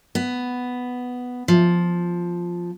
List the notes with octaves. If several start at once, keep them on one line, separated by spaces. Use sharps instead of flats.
B3
F3